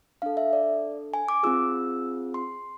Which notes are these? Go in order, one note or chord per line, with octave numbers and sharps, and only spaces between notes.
D4 A4 F5
E5
D5
G#5
D6
C4 F4 G#4 E6
C6